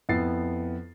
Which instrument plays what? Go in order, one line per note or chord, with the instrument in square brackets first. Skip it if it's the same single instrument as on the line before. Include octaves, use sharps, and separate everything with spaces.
[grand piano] F2 B3 E4 A6 C7